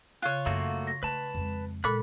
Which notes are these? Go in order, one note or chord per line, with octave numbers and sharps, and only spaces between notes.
C#3 F4 C#5 F#6
F#2 A3 A#3 F#4
A#6
A3 B4 A5
F2 G#3
A#2 G#3 A4 B5 F#6